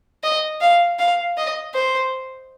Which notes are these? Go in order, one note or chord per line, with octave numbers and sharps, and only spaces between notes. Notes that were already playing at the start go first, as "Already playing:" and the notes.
D#5
F5
F5
D#5
C5